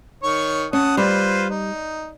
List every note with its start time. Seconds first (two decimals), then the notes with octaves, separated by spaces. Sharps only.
0.23 D#3 C#5 C#6
0.73 C#4 F#5 A5 D#6
0.97 G3 F4 B4 C5
1.50 D#4